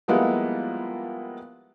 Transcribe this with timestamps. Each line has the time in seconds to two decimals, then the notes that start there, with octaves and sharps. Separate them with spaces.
0.08 F3 G3 G#3 A#3 B3 E4